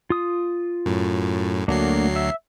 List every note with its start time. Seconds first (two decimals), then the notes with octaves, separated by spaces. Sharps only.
0.10 F4 D#6
0.86 F#2 A2
1.68 D2 F#3 A3 A#3 D4 C7
2.16 E5